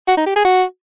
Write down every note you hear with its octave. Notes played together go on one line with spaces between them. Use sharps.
F#4
D#4
G4
G#4
F#4